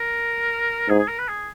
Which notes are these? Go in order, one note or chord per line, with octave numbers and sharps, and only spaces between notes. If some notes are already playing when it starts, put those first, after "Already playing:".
Already playing: A#4
G#2 G#4
G#4
A#4
B4
G#4